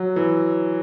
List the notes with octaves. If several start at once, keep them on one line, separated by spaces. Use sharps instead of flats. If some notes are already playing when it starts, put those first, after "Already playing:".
Already playing: F#3
E3